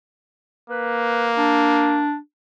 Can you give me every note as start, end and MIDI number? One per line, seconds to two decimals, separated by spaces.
0.70 2.09 58
0.70 1.31 71
1.37 2.16 62